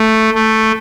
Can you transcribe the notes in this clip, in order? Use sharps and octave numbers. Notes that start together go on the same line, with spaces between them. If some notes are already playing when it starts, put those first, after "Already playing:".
Already playing: A3
A3